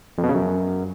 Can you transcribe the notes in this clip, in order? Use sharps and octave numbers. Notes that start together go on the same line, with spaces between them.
F2
B2
C#3
F#2